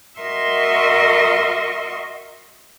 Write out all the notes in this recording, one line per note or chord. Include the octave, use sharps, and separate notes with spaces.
F#4 A#4 D#5 E5 C6 C#6